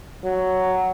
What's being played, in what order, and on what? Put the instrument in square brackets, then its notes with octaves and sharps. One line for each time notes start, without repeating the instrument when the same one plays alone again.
[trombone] F#3